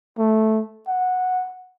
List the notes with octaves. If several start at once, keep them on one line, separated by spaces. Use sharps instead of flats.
A3
F#5